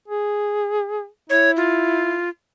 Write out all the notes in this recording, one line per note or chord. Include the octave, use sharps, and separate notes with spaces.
G#4
E4 C#5
F4